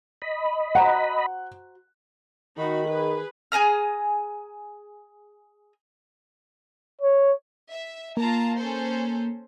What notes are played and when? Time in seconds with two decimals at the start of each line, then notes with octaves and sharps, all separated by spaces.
0.22 D#5 B5
0.75 F#4 C5 F#5 A#5
2.58 D#3 D#4 F#4 B5
2.88 G#4 B4
3.52 G#4 G#5 A#5 F6
7.01 C#5
7.70 E5
8.17 A#3 F4 A5 A#5
8.58 C#4 A4 C5